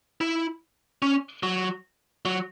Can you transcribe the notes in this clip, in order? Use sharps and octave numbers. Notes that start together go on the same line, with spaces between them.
E4
C#4
F#3
F#3